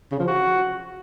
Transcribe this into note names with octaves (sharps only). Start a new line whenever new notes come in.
C#3
F3
F#4